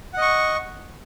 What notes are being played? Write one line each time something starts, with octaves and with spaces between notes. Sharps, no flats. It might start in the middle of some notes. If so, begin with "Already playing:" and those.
D#5 F#5 C#6